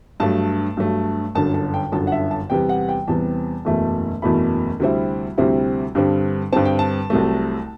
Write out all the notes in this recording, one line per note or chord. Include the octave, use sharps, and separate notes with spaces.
G2 F#3 A3 A5
G2 F#3 A3
G1 F#2 D3 A5
A5
G5
G1 F#2 D3 A5
F#5
E5
A5
E2 C3 G3 B3 G5
F#5
G5
E2 C3 G3 B3 A5
F#1 E2 B2 A3 E4
F#1 E2 B2 A3 E4 B5
D2 C3 G3 C4 E4
D2 C3 G3 C4 E4
G2 D3 G3 C4
G2 D3 G3 C4 A5
G5
A5
C2 C3 F#3 A3